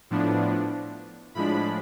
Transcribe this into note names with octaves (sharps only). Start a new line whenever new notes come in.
A2 F3 B3 D4
A2 F3 G#3 D4 B5